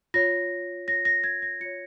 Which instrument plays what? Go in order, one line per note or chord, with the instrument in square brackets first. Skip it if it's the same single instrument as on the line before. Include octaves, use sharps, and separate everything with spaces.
[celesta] F4 C#5 A#6
F4 C#5 A#6
A#6
G#6
A#6
F4 C#5 C#7